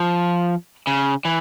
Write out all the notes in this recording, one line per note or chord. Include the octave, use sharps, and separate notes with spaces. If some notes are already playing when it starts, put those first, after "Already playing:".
Already playing: F3
C#3
E3